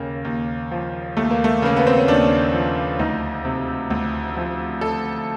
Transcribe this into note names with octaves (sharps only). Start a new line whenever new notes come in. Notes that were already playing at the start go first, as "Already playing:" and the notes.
Already playing: D#2 C#3 A#3
D#2
F3
D#2 A3
A#3
A3
C#3 A#3
B3
C4
C#4
D#2 D4
F3
D2 D#4
C3
D2
F3
A4